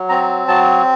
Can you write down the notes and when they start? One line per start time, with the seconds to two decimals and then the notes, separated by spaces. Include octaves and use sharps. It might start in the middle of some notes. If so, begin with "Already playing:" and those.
Already playing: F#3
0.09 C4 A#5
0.48 F#3 A5